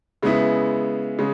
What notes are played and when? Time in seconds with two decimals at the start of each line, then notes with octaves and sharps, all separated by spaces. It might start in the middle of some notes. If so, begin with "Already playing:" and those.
0.22 C#3 G#3 B3 E4
1.19 C#3 G#3